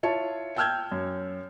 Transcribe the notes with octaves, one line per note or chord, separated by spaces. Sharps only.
E4 F4 C#5 A5
G5 A5 E6 F6 G6 G#6
F#2